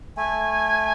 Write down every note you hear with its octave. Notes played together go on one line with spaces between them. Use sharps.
A3 G#5